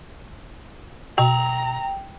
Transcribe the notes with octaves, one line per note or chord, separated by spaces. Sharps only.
B2 G5 A#5